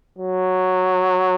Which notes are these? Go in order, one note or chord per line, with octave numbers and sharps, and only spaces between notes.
F#3